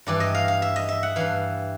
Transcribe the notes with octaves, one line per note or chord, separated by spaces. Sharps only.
G2 E3 D5
D#5
F5
F5
E5
D#5
E5
F#5
G2 E3 F5